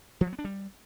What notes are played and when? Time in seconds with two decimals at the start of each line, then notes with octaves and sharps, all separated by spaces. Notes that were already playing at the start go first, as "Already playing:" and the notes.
0.21 F3
0.27 F#3
0.33 B3
0.39 D4
0.45 G3